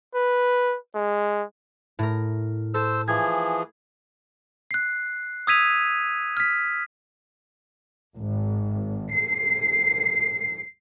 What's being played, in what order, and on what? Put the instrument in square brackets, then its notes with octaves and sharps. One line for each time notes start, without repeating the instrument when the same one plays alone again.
[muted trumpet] B4
G#3
[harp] A2 A#4
[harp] A4 [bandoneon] C5 E6
[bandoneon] E3 F3 G#4 [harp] G#6
[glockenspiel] F#6 C7
D#6 E6 G#6 B6 D#7 F7
F6 B6
[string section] G#1
C7